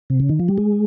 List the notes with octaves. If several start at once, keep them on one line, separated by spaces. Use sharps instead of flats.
C3
C#3
D#3
F3
G3
G#3